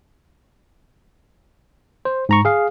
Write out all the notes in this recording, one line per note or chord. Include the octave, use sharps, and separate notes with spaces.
C5
G#2 A#5 C#6
G#4 F5